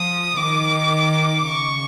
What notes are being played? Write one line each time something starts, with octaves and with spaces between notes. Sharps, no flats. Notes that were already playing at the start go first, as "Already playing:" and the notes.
Already playing: F3 D#6
D#3 D6
C#3 C#6